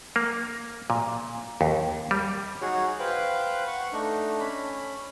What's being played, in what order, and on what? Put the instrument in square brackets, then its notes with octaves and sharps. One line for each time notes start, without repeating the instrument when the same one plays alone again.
[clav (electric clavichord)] A#3
A#2
D#2
G3
[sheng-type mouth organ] D#4 F#4 G#4 C#5 F#5
B4 C5 F5 G5 F#6
F#5 C#6
A3 D4 D#4
C#4 B5